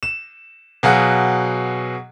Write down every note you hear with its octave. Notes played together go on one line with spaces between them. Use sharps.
E7
B2 F#3 G#4 F5 F#5